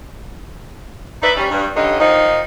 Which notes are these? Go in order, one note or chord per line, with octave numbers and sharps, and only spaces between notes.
D#4 B4 D5 E5
G3 C#4
G2
G2 D3 C#4 D#4
D#3 F3 D#4